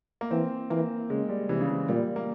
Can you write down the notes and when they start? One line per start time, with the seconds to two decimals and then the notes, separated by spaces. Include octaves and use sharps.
0.21 A#3
0.31 E3 C4
0.70 E3 A#3
1.10 C#3 G#3
1.29 G3
1.49 C3 E3
1.61 C#3
1.69 E3
1.89 A#2 G3
2.16 A#3